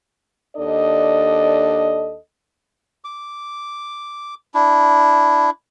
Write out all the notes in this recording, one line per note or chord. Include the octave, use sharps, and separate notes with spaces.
D#2 D4 A4 D5 D#5
D6
D4 E4